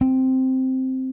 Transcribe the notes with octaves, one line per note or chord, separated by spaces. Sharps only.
C4